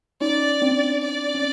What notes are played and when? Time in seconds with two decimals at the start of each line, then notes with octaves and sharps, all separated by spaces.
0.21 C#4 D#4 D5
0.62 C4 D4
1.02 D5
1.35 C#4